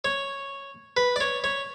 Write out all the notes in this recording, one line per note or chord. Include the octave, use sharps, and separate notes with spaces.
C#5
B4
D5
C#5
C#5